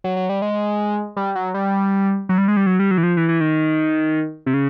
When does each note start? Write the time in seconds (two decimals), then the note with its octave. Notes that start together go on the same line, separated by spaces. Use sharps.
0.04 F#3
0.16 F#3
0.29 G3
0.42 G#3
1.17 G3
1.35 F#3
1.54 G3
2.29 F#3
2.38 G3
2.48 G#3
2.57 G3
2.66 F#3
2.79 G3
2.91 F#3
2.98 E3
3.03 F3
3.17 E3
3.29 E3
3.41 D#3
4.46 C3
4.54 C#3